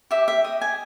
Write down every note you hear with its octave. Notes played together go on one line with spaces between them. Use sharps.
G4 E5
E5
D#5
G#5